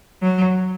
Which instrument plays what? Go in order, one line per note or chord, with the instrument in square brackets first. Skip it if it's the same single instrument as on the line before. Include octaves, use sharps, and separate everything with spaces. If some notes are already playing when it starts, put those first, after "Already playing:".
[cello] F#3